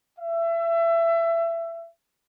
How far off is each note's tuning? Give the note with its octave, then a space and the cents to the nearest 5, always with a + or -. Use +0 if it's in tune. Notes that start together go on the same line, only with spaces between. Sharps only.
E5 +25